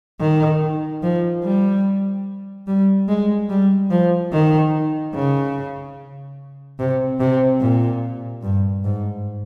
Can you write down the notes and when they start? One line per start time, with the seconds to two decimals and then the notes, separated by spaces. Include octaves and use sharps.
0.21 D#3
1.03 F3
1.44 G3
2.67 G3
3.09 G#3
3.49 G3
3.90 F3
4.32 D#3
5.14 C#3
6.79 C3
7.20 C3
7.61 A#2
8.43 G2
8.84 G#2